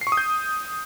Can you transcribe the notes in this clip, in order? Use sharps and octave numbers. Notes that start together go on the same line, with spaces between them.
C7
C#6
D#6
G6